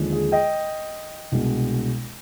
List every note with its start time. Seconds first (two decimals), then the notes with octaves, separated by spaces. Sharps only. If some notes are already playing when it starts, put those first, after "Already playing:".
Already playing: D#2 D3 F3 G#3
0.12 G#4
0.32 D#5 G5
1.32 C2 B2 G#3 D4